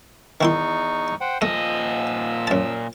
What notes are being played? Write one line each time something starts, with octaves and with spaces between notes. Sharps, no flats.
E2 D#3 D#4 E4 C6 C#6
C5 F#5 G5
A#2 F3 A3 D#5 E6
F#2 A5